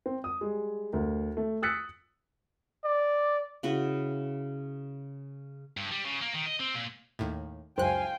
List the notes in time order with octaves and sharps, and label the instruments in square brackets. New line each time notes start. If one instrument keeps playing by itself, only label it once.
[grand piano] C4
D#6
G3 G#3
D2 A#4
A3
D#6 E6 F#6 A6 B6 C#7
[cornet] D5
[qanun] C#3 E4 F#4 B4
[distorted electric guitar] G2
G3
C#3
A#3
D#3
D#5
C4
A#2
[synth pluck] D#2 A2
[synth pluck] C#2 F#2 F#6 [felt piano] C5 [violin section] F5 G#5 [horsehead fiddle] G5